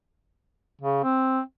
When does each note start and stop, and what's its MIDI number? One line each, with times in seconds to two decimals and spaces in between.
0.81 1.02 49
1.04 1.40 60